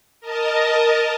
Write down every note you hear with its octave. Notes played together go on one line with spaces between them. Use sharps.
A#4 D#5 A5